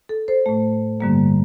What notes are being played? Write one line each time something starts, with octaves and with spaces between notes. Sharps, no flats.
A4
A4 C5
A2 A3
G2 D3 G3 A#3